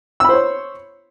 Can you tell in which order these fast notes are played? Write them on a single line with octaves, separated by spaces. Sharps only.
E6 B5 C5 C#5